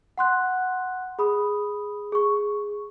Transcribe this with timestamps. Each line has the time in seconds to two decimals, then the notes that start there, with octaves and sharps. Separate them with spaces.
0.18 F#5 C6 F#6
1.19 G#4 B5 D#6
2.12 G#4 C#6